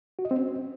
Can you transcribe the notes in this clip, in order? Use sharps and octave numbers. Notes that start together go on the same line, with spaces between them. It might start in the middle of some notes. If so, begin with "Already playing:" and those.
F#4
D#5
C4
C#4